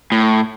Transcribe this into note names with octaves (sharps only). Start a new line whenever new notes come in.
A2